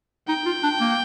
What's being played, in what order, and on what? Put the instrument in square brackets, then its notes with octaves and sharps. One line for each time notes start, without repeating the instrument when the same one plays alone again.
[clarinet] D#4 [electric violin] G5
[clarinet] F4
D4
A#3